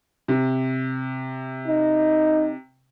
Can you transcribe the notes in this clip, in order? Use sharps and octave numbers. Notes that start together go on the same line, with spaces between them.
C3
D#4